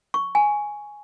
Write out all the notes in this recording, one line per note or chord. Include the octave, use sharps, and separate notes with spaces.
C#6
G#5